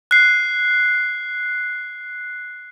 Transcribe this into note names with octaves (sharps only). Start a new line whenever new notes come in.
F#6 C7